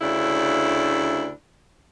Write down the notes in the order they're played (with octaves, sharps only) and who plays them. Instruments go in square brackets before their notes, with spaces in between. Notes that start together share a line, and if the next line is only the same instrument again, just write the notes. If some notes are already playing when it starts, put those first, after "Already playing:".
[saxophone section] D2 C#3 D4 E4